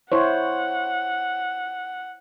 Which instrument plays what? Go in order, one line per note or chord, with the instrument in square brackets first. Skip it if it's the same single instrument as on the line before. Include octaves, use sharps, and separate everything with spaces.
[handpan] E4 C5 C#5 [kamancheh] F#5